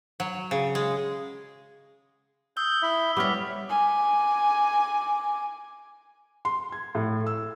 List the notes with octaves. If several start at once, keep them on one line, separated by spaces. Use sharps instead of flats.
F#3
C#3
G#3
D#6 E6 G6 G7
E4 E5
G3 B3 C#5 D6 F6 B6
G#5 D6
C6
G#6
A2
E6